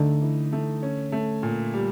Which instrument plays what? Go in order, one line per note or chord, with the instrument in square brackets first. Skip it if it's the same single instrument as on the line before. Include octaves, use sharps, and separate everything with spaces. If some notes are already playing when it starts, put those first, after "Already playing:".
Already playing: [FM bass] D3 [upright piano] A3 D#4
[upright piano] E3
A3
C#4
A3
A#2
G3